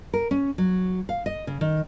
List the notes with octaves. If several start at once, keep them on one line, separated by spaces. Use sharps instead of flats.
A#4
C#4
F#3
F5
D#5
C#3
D#3